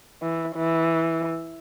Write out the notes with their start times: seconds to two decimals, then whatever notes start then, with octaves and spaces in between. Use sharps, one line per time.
0.22 E3
0.56 E3